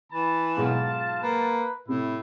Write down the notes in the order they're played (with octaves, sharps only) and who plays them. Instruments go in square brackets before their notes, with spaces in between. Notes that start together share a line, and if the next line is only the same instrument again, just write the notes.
[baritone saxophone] E3 [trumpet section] A5 [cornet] B5
[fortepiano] B1 G#2 [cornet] F4
[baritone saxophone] A#3 [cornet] B4
[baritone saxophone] A2 [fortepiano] C3 [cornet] E4